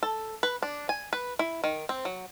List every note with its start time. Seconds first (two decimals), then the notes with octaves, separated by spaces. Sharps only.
0.03 A4
0.43 B4
0.63 D4
0.89 G#5
1.13 B4
1.39 E4
1.64 D#3
1.89 C4
2.05 F#3